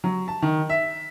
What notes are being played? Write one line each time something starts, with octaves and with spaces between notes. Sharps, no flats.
F#3
A5
D#3
E5